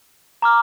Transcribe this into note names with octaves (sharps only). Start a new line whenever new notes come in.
A#5 D6 F6